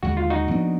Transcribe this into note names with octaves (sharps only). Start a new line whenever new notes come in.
D#2 D3 G#3 F#4
F4
D#4 F#4
A#2 F3 B3 D4